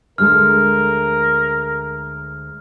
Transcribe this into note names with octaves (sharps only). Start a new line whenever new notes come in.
D2 G#3 A4 A#4 F6